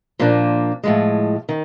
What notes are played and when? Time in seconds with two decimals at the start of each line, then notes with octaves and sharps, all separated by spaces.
0.19 A#2 F3 A#3 D4
0.83 A2 F3 G#3
1.49 D#3